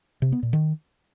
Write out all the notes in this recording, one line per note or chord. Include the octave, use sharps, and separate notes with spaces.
C3
B3
A#2
D#3